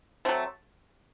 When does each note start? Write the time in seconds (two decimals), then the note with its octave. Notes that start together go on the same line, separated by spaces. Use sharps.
0.25 F#3 A3 C4